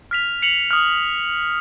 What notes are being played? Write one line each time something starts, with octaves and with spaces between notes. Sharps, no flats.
F6 B6 F7
C#7 F7 F#7
D#6 F6